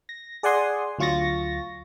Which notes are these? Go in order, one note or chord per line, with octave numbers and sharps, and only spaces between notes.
A#6
G#4 D5 F#5 G#5 C6 D#6
D2 F#3 F4 C#6 A6 A#6